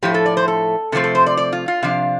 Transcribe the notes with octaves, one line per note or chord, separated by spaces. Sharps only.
A2 F3 A3 G4
A4
D5
C5
A4
C3 F3 A3 C4 A4
A4
C5
D5
D5
F4
F4
C3 F3 D4 F5